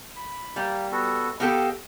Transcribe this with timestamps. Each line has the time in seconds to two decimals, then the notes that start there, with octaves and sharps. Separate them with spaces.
0.16 B5
0.56 G3 A#3
0.92 B3 F#4 A4
1.40 B3 G4 A4 D#5 F5 E6